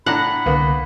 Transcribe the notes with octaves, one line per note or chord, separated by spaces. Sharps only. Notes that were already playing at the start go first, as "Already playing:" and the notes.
A2 D4 F#5 A#5 B5
C2 D3 A#3 B3